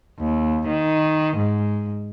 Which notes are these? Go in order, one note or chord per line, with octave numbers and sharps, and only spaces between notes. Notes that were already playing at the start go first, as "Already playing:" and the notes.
D#2
D#3
G#2